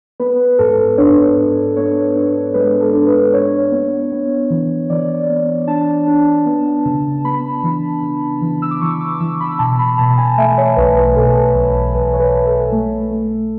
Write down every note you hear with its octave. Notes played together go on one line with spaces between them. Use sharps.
B3 B4
G#2 A4
D4 C#5
G#2
B3 C#5
D4
G#3 B4
A4
D4
B4
D4 C#5
B3
B3
E3
E3 D5
B3
D4 A5
D4
B3
C#3
B3 B5
E3
C#3
E3
E6
D6
E3 C#6
D6
E3 E6
B5
B2 A5
B5
B2 A5
A5
G#5
A3 E5
C#5
B1 B4
B4
B2 A4
B1
B1 B4
C#5
B4
B1
A4
A3
A3